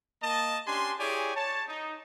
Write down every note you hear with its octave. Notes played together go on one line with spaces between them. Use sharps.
A#3 D#5 A5
C#4 D4 G4 G#5 C6
E4 G4 G#4 C#5 D5 G#5
C#5 A5
D#4